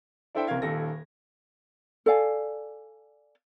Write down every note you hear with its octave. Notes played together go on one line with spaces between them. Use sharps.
D4 E4 A4 C5 E5 G5
F#1 C2 C4 A#4 F5 G#6
D#1 D#2 A4 A#6
A4 D5 F5 G#5